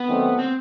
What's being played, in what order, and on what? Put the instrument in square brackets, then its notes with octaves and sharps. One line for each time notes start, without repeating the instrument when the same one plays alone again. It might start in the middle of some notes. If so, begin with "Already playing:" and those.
Already playing: [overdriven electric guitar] B3
[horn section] D#3 F#3 A3 C4
[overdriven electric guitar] C4